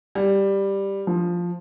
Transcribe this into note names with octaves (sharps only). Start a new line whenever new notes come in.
G3
F3